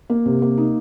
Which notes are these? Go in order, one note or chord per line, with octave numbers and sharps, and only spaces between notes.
A#3
C3
A#3
D#4